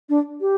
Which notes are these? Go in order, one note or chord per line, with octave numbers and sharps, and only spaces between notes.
D4
G4